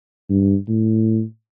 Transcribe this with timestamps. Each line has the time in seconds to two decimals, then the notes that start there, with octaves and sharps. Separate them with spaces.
0.30 G2
0.68 A2